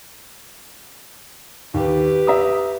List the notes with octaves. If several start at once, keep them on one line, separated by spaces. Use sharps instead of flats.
D#2 G4 B4
E5 A#5 D#6